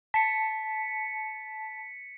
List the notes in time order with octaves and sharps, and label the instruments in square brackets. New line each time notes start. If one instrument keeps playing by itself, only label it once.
[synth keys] A5 [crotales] B6 C#7